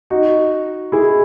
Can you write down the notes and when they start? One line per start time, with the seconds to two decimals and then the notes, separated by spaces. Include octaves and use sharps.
0.10 D#4 F#4
0.92 E4 G#4